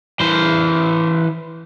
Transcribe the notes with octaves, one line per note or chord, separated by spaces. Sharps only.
E3 C5